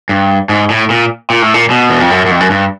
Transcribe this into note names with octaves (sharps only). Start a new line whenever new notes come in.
G2
G#2
A2
A#2
A#2
A2
A#2
B2
E2
F2
F#2
F#2
F2
F#2
G2